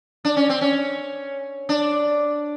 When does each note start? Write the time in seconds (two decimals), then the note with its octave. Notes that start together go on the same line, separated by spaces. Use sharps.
0.25 D4
0.37 C#4
0.49 C4
0.61 C#4
1.69 D4